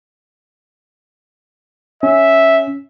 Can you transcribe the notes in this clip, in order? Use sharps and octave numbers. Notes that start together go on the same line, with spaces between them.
C#4 E5